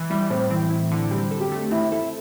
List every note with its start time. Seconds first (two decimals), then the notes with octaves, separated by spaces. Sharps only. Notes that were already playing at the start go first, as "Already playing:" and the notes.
Already playing: E3
0.10 G3 E4
0.30 A2 C4
0.50 E3 C4
0.70 E4
0.91 D3
1.11 G3 C4
1.31 A4
1.40 G4
1.52 A3
1.71 C4 E4
1.92 E4 A4